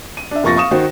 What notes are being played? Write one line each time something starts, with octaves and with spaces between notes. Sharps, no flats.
D#7
D4 E5
F1 A#3 F4 C#6 A6 A#6
F5 C#6 D#6 E7
D#3 F#4 C5